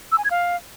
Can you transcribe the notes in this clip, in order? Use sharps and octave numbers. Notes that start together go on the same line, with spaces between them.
E6
G#5
G#6
F5